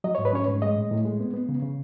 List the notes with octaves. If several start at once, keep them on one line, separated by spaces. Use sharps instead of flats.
F#3 D#5
G#2 C#5
B4
C#4 C#5
G#2
G#3 D#5
A2
A2
G#3
B3
B3
C#3
C#3